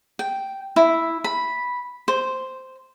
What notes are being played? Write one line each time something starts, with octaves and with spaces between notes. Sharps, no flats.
G5
E4
B5
C5